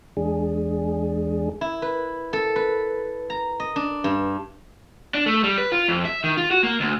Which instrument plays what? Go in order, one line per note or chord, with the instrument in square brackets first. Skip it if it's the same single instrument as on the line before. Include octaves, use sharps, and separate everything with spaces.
[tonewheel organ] E2 G#3 D4 G#4
[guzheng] E4
B4
A4
B4
A#5
D#5
D4
G2
[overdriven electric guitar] D4
A3
G3
B4
F4
F2
E5
D#3
F4
F#4
A#3
D2